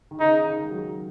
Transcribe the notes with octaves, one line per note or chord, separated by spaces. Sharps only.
D#3
C#3 D#4
D#3
G#3
F#3